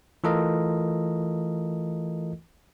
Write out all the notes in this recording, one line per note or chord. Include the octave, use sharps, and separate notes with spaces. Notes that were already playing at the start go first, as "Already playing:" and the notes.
E3 A3 F4 A4 A#4 D#5